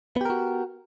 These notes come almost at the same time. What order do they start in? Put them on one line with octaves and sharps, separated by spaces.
B3 G4 A#4 F#4